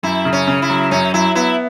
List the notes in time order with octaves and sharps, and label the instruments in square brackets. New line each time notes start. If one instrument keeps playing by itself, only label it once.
[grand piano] F#2 [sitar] E4
[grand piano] C#3
[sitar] C#4
[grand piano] C#3
[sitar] E4
[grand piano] F#3
[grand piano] F#2 [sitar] C#4
[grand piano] F#3 [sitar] E4
[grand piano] B3 [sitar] E4